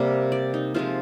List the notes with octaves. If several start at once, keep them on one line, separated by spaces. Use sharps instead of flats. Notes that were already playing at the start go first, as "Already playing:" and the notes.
Already playing: C3 G3 A#3
D5
D#4
C3 F3 G#3 F4